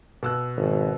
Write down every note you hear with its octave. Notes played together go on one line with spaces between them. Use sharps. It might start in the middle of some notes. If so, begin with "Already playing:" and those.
B2 E6 F#6
G#1